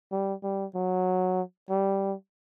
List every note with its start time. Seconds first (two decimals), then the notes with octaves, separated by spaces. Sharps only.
0.11 G3
0.43 G3
0.75 F#3
1.70 G3